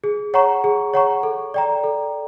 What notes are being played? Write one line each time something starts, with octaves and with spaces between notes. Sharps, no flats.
G#4
C#5 F#5 A#5 C#6
G#4
C#5 F#5 A#5 C#6
A4
D5 G5 A#5
A4